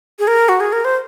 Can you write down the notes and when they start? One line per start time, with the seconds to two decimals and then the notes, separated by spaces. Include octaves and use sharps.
0.19 G#4
0.27 A#4
0.49 F#4
0.60 G#4
0.72 A#4
0.85 C5